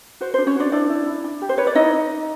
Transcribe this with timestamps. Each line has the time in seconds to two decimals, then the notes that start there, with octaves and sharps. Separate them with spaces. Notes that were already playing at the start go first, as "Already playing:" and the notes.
0.21 F#4 C5
0.34 C5
0.38 D4
0.46 C#4 C#5
0.56 D4 F#4 D5
0.72 D4 E4 D5
0.90 E4
1.06 E4
1.24 D4
1.42 G4
1.49 C5
1.58 B4 C#5
1.67 D5
1.75 D#4 E4 D#5